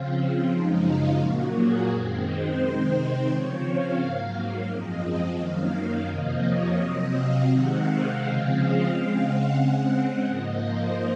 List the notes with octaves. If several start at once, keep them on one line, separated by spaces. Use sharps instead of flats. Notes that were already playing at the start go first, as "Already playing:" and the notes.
Already playing: C#3 F3 C4 F4
F4
F#2 C#3 F3 G#3 D#4
F4
A#2 F#3 A#3 F#4
G#4
F#2 D#3 G#3 C4
C5
C3 D#3 G#3 C4
C#3 F3 C4 C#5
F5
G#2 F#3 A#3
F5
F#2 F3 G#3 C4 D#5
F#2 D#3 F#3 A#3 F5
F5
F2 C3 F3 A#3 D#5
C#5
C3 F#3 C4 D#5
F5
C3 D#3 G#3 C4 F#5
F5
C#3 F3 G#3 C4
D#5
C#3 G#3 C4 F5
F#5
C#3 G#3 C4
G#2 F3 A#3 D#5
C5